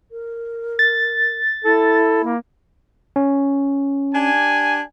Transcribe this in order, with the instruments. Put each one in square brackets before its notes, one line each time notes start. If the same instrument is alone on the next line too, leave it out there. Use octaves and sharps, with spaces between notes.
[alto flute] A#4
[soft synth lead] A6
[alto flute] E4 [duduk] A4
[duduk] A#3
[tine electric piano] C#4
[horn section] D4 G4 G#5